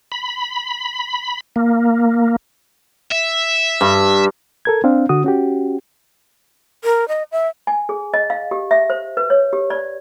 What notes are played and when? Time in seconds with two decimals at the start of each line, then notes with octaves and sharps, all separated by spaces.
0.12 B5
1.56 A#3
3.12 E5
3.81 G2
4.65 A4 A#4 G#6
4.84 C4 D4 F5
5.09 D3 F#4 D#6
5.24 C#4 F#4 G4
6.84 A#4
7.08 D#5
7.32 E5
7.67 G#5
7.89 G#4
8.14 D#5
8.30 F5
8.51 G4
8.71 E5
8.90 C5
9.17 B4
9.30 C#5
9.53 G4
9.70 D5